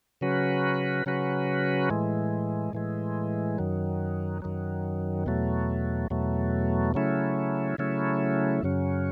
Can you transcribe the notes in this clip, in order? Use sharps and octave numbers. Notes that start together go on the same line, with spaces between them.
C#3 F#3 C#4 F#4 B4
C#3 F#3 C#4 F#4 B4
A2 E3 G#3
A2 E3 G#3
F#2 D#3 F#3
F#2 D#3 F#3
E2 B2 F#3 A3
E2 B2 F#3 A3
C#3 F#3 A3 C#4 E4
C#3 F#3 A3 C#4 E4
F#2 C#3 F#3 C#4